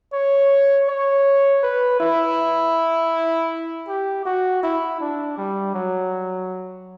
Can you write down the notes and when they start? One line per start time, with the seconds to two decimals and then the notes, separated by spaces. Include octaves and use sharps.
0.13 C#5
0.89 C#5
1.63 B4
2.00 E4
3.88 G4
4.25 F#4
4.63 E4
5.00 D4
5.37 G3
5.75 F#3